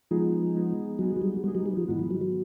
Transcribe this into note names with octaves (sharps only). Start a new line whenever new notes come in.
F3 G#3 B3 D#4 G#4
G#3 B3 D#4 G#4
F#3 G#3 B3 D#4 G#4
F#3
G3
G3 G#3 B3 D#4 G#4
F#3
G3
F3
G#2 D#3 E3 G#3 B3
F3
F#3
F#3